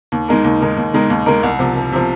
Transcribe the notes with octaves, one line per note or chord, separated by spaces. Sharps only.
D#2
D#3 G#3 D#4 A#4
D#2
D#3 G#3 D#4 A#4
D#2
D#3 G#3 D#4 A#4
D#2
D#3 G#3 D#4 A#4
C2
C3 F3
C2
C3 F3